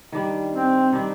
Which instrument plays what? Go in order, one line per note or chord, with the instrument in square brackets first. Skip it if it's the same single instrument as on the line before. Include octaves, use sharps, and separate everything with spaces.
[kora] D#3 G3 D4
[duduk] C4
[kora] D#3 G3 D4